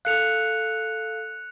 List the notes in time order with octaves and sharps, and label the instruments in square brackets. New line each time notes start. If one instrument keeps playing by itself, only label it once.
[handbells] A4 F5 [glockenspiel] F#6 C#7 F7